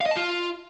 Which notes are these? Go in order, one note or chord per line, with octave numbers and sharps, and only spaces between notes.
F5
D#5
A5
F4